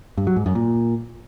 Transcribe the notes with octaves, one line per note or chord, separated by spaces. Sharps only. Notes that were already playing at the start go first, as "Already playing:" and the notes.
G2
F#3
G#2
F#2
A#2